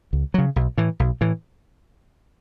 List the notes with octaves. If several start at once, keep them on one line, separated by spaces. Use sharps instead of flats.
C#2
C#3 F#3
B1
A2 E3
B1
A2 E3